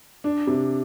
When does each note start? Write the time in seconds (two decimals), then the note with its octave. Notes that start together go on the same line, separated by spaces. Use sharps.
0.24 D4
0.47 C3